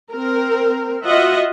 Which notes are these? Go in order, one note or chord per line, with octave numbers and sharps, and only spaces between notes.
C4 A#4
F4 F#4 D#5 E5 F#5